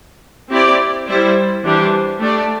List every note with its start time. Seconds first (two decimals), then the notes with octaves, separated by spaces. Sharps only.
0.50 C4 E4 G4 D5
1.07 G3 E4 C5
1.64 E3 G3 D4 G4 C5
2.21 A3 D4 G4 D5